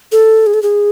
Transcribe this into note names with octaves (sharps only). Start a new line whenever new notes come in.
A4
G#4
A4
G#4